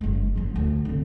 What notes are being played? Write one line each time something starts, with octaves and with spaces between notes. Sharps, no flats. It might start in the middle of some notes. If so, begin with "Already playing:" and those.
F#1 G#3
A1 F3
D2
D3 C4